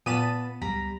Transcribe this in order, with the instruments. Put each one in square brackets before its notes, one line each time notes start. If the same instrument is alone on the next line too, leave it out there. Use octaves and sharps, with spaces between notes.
[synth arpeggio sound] A#2 D#7 [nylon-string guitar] B3 [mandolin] A5 B5 D#6
[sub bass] C#2 [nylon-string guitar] G3 [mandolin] A#5 B5